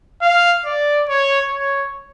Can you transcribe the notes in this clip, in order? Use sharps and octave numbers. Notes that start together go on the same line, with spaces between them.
F5
D5
C#5
C#5